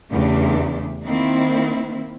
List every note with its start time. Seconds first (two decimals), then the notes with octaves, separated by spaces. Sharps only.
0.11 E2 C#3 A3 D4 G4
1.04 D#3 A#3 C4 E4